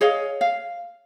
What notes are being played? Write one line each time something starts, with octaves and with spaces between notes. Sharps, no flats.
G#4 C#5 D#5 F5
F5